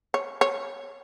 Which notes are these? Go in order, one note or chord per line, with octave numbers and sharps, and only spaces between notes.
C#5
C#5